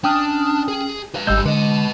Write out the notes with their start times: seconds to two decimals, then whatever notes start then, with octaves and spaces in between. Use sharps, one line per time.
0.04 C#4 D4 G5 D#6 F6
0.68 G#4
1.15 B4 F5
1.27 G#1 G#2 G3 G#3 E6 G6
1.46 D3 G#3 B4 D#5